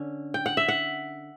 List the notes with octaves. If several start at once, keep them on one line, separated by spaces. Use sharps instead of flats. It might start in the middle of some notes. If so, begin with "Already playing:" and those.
Already playing: D3 C#4
G5
F#5
E5
F#5